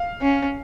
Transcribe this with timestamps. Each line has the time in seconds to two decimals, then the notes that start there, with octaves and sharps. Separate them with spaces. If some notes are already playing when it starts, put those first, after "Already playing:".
Already playing: F5
0.21 C#4